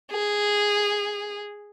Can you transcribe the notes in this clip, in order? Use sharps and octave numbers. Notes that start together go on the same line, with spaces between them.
G#4